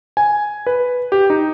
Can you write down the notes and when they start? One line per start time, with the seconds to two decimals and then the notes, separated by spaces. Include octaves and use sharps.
0.17 G#5
0.67 B4
1.12 G4
1.30 D#4